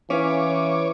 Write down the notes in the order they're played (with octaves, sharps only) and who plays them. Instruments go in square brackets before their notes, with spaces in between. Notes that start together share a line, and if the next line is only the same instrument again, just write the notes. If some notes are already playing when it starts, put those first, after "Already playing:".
[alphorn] E3 [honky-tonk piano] C#4 [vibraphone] B4 F5 [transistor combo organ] C#5 D6